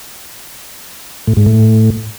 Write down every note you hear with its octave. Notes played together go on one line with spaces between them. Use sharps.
A2
G#2
A2